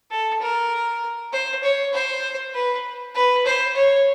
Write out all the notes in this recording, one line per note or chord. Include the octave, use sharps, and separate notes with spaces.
A4
A#4
C5
C#5
C5
B4
B4
C5
C#5